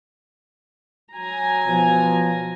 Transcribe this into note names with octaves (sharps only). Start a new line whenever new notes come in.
F#3 G#5 A#5
B2 F3